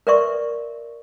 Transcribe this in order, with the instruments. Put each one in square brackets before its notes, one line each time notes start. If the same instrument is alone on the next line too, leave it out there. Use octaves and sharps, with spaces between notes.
[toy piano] A#4 B4 D5 E5 C6 C#6